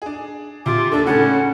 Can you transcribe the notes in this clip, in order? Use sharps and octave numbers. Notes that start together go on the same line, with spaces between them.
D4 G#4
C3 F4 D6
D#2 D4 A4
A2 C#3 C#4 F#5